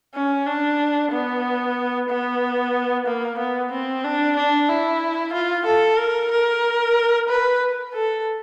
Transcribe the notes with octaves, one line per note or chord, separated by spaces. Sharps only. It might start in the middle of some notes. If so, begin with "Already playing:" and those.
C#4
D4
B3
B3
A#3
B3
C4
D4
D4
E4
F4
A4
A#4
A#4
B4
A4